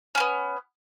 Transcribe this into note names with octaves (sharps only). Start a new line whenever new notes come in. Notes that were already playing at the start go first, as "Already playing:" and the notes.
A#3 B3 C#4